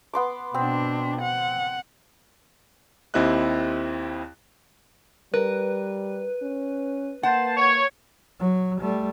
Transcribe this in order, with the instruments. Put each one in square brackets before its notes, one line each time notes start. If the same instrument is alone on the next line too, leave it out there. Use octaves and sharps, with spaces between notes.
[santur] B3 C6 D6
[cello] B2 D4 [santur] C4
[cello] F#5
[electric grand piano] D#2 C4 E4 G4 D#5 F#6
[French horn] G3 [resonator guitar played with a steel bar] A#4 [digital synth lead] B4
[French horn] C#4
[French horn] A#3 [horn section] C5 A5 [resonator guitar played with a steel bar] F#5
[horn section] C#5
[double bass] F#3
G3 A3